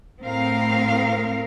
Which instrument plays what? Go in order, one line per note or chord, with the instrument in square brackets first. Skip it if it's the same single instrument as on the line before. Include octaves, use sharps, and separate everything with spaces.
[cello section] A2 C4 A#4 F5